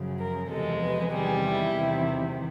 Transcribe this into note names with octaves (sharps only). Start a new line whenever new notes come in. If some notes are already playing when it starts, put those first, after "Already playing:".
Already playing: F#2 C#3 F3
A#4
E2 C3 F3 G#3 A4
B4
E2 C3 D#3 G3 G#4
E4
E2 C3 D#3